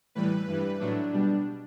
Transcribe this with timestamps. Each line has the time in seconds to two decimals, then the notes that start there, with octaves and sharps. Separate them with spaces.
0.15 A2 E3 G3 B4
0.47 G2 E3 G3
0.80 A2 F#3 A3 D4
1.13 B2 G3 D4